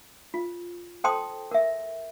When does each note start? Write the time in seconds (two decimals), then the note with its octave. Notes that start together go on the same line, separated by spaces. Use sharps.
0.34 F4
1.04 A4 C5 G5 A5 C6 D#6
1.51 A#4 E5